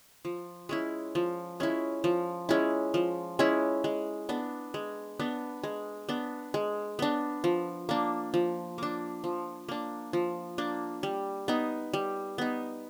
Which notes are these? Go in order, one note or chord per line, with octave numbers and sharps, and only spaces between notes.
F3
G#3 C#4 E4
F3
G#3 C#4 E4
F3
G#3 C#4 E4
F3
G#3 C#4 E4
G#3
B3 D4
G#3
B3 D4
G#3
B3 D4
G#3
B3 D4
F3
A#3 D4
F3
A#3 D4
F3
A#3 D4
F3
A#3 D4
G3
B3 D#4
G3
B3 D#4